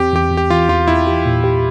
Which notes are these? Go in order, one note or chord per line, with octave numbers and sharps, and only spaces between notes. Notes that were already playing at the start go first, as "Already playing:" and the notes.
Already playing: E2 C4 G4
E2 G4
E2
G4
E3 F4
E2 F4
E2 E4
G4
A#2
G4